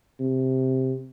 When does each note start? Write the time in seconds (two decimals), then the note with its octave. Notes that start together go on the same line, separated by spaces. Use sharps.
0.20 C3